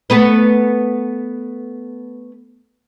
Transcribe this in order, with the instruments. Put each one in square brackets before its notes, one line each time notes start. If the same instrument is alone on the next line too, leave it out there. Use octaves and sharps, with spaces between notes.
[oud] A3 B3 B4